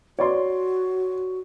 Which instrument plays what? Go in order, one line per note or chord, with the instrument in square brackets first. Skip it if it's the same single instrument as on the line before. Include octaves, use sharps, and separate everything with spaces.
[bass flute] F#4 [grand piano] C#5 D5 C6